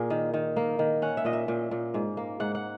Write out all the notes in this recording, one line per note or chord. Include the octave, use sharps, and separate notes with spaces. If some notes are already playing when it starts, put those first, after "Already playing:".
Already playing: A#2 A#3 G#4 A#4
D#3
D#3
A#3
D#3
C#4 F#5
E5
A#2 D#5
E5
A#2
A#2
G#2
A#3
G#2 F#5
F#5